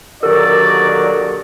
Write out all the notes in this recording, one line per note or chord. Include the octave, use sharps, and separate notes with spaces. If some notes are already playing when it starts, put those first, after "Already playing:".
A#2 D3 D#3 F#3 F#4 G4 A#4 D5